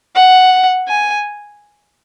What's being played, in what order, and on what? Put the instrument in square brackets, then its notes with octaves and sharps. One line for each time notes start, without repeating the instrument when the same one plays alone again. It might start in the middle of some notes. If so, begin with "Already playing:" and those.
[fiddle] F#5
G#5